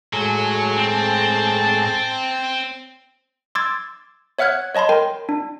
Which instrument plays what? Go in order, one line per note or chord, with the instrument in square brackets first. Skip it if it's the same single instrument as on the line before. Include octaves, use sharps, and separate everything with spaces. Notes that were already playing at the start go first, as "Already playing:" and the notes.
[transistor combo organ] A2 G#3 [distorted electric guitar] F#3
[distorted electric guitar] C4 [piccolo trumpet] A5
[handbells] C6 D6 E6 G#6 A6
C#5 E5 F#5 F6 F#6 G#6
C#5 D#5 A5 B5 C6
A#4 G5 C6
D4